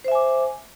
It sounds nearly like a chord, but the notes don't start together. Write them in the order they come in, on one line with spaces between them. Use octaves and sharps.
C5 E5 G#5 D6